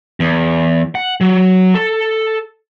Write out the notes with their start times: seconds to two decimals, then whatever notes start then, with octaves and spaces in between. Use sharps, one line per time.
0.20 E2
0.95 F#5
1.21 F#3
1.74 A4